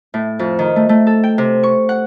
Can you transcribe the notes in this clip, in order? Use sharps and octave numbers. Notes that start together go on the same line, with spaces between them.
A2
F2
D#3
A3
A3
A4
G5
C3
C#6
F#5